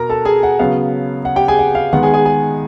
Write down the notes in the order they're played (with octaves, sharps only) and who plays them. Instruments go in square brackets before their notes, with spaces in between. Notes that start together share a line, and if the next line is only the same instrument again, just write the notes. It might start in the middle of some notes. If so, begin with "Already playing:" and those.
Already playing: [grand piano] B2 B3 A#4 A#5
A4 A5
G#4 G#5
F#5
C#3 F#3 B3 F5
F#5
G4 G5
G#4 G#5
F#5
F5
D#3 G#3 B3 F#5
G#4 G#5
G#4 G#5
G#4 G#5